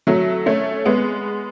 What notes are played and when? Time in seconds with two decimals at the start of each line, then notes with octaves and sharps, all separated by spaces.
0.07 F#3 A3
0.46 A3 C#4
0.85 G#3 B3